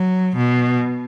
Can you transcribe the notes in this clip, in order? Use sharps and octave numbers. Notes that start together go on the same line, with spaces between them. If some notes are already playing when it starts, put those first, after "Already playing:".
Already playing: F#3
B2